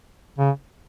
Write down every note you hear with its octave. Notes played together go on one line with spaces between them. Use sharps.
C#3